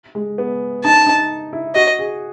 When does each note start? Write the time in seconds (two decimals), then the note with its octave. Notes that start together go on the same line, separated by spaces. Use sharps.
0.15 G#3
0.38 B3
0.84 D#4 A5
1.06 D#4
1.53 E4
1.75 F#4 D#5
1.99 G#4